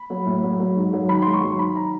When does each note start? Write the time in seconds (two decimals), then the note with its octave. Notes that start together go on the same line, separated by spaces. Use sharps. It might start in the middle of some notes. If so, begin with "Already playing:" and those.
Already playing: B5
0.10 F#3
0.26 A2
0.44 F#3
0.60 F#3
0.76 G#2
0.93 F#3
1.09 D#3 B5
1.22 G#2 C6
1.33 C#6
1.43 F#3 C6
1.59 D#3 B5
1.76 A#5